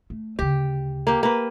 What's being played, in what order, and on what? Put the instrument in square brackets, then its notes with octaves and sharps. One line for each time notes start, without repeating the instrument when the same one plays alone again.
[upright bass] A3
[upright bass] D2 C#3 [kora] G4
[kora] A#3 G4
A#3 B4